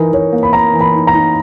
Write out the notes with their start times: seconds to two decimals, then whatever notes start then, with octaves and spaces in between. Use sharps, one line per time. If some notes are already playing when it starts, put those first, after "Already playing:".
Already playing: E3 D#4 A#4
0.13 E3 C#5
0.33 A#3
0.43 B5
0.53 A#4 A#5
0.73 E3
0.81 B5
0.94 D#4
1.07 A#5
1.13 D#4